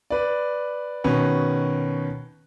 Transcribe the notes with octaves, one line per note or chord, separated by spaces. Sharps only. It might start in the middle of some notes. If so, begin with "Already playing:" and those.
B4 D5
B2 D#3 C#4 B4